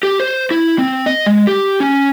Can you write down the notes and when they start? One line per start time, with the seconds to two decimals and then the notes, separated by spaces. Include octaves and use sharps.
0.03 G4
0.20 C5
0.51 E4
0.79 C4
1.06 D#5
1.26 G#3
1.47 G4
1.80 C#4